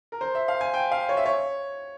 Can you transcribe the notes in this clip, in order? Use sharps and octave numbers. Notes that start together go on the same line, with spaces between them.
A#4
C5
E5
F5
G#5
G5
F5
C#5
E5
C#5